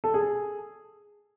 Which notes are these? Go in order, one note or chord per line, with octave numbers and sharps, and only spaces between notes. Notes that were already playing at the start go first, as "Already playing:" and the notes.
A4
G#4